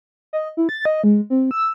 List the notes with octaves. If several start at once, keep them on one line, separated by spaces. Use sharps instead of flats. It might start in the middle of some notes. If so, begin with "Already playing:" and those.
D#5
E4
A6
D#5
G#3
C4
E6